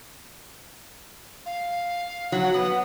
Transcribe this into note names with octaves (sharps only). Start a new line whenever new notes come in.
F5
F#3 F#5
B3